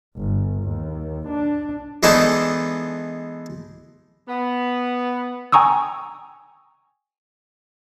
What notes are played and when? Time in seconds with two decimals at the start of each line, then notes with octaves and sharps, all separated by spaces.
0.17 G1
0.64 D#2
1.28 D4
2.03 E3 G#3 B3 D4 D#4 A4
4.27 B3
5.52 G5 G#5 A#5 C#6 D#6 E6